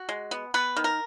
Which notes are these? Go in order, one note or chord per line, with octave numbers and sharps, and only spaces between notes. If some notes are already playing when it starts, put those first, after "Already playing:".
Already playing: F#4
G#3
B3
B3 B4
D#3
A#4